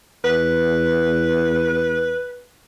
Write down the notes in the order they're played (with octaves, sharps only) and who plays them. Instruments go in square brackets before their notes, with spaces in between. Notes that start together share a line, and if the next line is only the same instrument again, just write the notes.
[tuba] E2 [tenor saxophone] B4